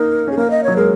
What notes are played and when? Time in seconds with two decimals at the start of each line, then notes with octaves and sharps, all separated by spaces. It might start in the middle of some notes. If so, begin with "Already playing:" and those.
Already playing: A#3 D#4 A#4
0.28 C#4 G#4
0.37 A#3 A#4
0.51 D#5
0.64 F#3 C#5
0.76 G#3 A#4